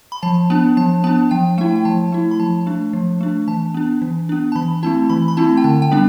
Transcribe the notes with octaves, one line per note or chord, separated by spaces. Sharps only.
B5
F3 A5
B3 D4 A5
F3 A5
B3 D4 A5
F3 G5
A3 E4 G5
G5
F3 A5
A3 E4
B5
F3 A5
A3 D4
F3
A3 D4
E3 A5
B3 D4
E3
B3 D4
A5
E3 B5
A3 C4 E4 A5
E3 B5
B5
A3 C4 E4 A5
G5
D3 A5
G5
G3 B3 D4